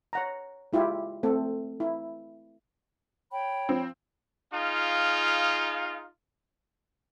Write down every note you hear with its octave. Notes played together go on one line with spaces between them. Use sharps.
C#5 F#5 A#5
G#3 E4 F4 G4
A3 C4 A4
E4
C#5 G5 B5
F3 C4
D#4 F4 G#4 F5